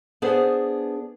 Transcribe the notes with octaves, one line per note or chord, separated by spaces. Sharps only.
B3 D4 G#4 B4 C5